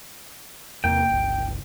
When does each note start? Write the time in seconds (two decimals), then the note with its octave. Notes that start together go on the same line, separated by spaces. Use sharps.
0.84 E2 C3 A#3 G5
1.10 G1 C#2